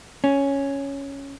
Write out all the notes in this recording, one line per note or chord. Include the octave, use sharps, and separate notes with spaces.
C#4